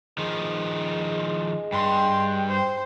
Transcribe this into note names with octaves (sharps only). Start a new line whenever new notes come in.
D#3 F3 G#3
G2 G5 C6
C5